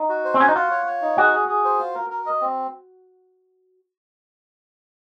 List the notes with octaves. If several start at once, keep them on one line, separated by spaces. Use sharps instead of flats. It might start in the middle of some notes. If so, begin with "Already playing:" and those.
Already playing: D#4
F#4
C5
C4
C#4 F#4
D#4
F4 F#5
C#5
C#5
D#4
F#4 G#4
G#4
G#4
C5
F4
A#4
A#4
D#5
C4